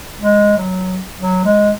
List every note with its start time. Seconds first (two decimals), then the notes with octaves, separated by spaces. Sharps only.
0.20 G#3
0.58 F#3
1.20 F#3
1.45 G#3